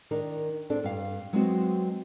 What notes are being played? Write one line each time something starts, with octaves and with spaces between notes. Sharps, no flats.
D#3 D4 D#4 A#4
C4 D4 A4
G2 F5
F#3 G#3 B3 C4 F4 F#4